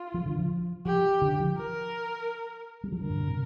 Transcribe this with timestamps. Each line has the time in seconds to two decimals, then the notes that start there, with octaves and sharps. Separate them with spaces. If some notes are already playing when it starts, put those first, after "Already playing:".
Already playing: F4
0.14 F3
0.26 D3
0.39 F3
0.85 F3 G4
1.22 D3
1.40 F3
1.58 A#4
2.84 G3
2.92 F3
3.00 D3 A#4
3.10 G2
3.19 A#2
3.28 C3